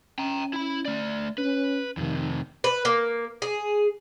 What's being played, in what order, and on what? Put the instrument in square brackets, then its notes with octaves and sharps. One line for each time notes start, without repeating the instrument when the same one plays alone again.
[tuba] C#4 [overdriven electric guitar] G5 A#5
[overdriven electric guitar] E4 B5
A3 D5
[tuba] C#4 [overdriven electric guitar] B4
[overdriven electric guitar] F2 C3 [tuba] D#3
[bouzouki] B4
A#3
G#4